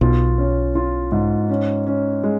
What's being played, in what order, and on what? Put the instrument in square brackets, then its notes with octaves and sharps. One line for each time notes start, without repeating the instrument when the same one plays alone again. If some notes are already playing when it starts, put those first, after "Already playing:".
[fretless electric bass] B1 B2 [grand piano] F4
[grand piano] C#4
F4
G#2
C#4
C#4
G#3